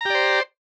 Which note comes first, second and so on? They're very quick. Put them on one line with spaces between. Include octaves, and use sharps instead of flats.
A#5 G4 D5 C5